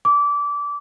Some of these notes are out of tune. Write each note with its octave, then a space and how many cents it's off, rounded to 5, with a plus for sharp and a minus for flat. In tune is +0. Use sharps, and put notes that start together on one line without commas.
D6 -20